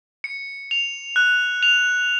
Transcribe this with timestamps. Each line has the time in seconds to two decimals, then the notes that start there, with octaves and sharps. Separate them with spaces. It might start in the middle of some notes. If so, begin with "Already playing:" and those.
0.24 C#7
0.71 F7
1.16 F#6
1.63 F7